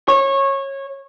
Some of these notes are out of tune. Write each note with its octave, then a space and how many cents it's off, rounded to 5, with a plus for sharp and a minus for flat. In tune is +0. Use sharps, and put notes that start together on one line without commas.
C#5 -20